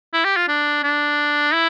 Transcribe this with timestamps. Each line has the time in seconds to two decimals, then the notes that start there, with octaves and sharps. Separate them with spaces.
0.13 E4
0.25 G4
0.36 F4
0.48 D4
0.83 D4
1.53 E4